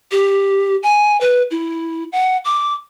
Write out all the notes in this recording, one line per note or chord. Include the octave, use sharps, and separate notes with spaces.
G4
G#5
B4
E4
F#5
D6